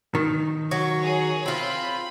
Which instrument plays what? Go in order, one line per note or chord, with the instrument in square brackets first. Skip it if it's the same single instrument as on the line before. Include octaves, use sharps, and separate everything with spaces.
[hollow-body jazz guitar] D#3
[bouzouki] F#3 [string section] C#6
[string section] G#4 C#5
[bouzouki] C4 F4 [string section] B5